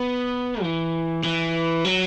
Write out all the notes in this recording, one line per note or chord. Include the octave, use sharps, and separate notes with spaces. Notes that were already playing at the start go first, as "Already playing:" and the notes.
Already playing: B3
E3
E3
F#3